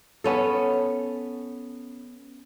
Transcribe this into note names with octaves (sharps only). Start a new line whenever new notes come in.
B3 C#4 A4